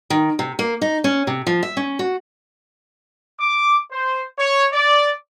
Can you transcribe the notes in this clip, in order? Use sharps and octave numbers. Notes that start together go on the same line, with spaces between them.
D#3
C3
A#3
D#4
C#4
C3
F3
E5
C#4
F#4
D6
C5
C#5
D5